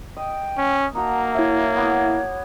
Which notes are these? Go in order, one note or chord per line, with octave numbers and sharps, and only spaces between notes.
D#5 G5
C#4
A#3 D#4 F#4 A5 A#5
E4 C#5 E5
B3 D6